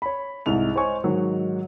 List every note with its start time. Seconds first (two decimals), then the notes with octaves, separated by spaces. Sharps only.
0.02 C#5 B5
0.46 C2 G#2 F7
0.76 C5 C#5 D#5 G#5 C#6
1.04 G#2 D#3 F#3